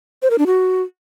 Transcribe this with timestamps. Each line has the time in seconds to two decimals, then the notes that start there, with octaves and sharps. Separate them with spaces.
0.22 C5
0.30 A#4
0.38 D4
0.46 F#4